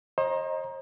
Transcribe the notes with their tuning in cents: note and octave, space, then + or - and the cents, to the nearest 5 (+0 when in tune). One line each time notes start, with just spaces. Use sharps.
C5 +40 D#5 +0 A#5 +15